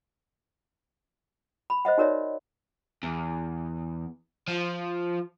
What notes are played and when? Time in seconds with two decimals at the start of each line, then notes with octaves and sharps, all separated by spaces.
1.70 B5
1.85 C5 D#5 E5 F#5
1.98 D#4 F#4 A#4 C#5 D5 E5
3.03 E2
4.48 F3